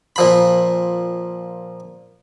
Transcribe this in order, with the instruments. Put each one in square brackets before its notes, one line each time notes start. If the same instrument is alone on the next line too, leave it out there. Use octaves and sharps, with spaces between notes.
[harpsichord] A#2 F3 B5